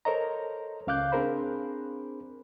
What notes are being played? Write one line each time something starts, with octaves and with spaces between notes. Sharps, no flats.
A4 A#4 C5 C#5 D#5 A#5
C#2 C#3 F5 D6 F#6 G6
C4 D4 G#4 A#4 C5 B5